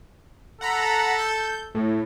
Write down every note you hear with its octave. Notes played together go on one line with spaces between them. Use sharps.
A4 F#5 A#5 B5
G6
A2